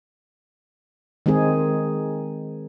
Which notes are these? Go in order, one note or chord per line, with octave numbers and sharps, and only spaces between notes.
D#3 G#3 C4 D#4 G#4